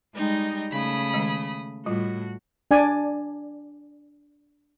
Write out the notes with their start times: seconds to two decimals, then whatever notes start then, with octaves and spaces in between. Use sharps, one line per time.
0.14 G3 G#3 D#4 D#5 G5
0.72 C#3 A3 B5 D#6
1.14 D#3 G#3
1.86 A2 G3 F4 F#4
2.71 D4 D5 G#5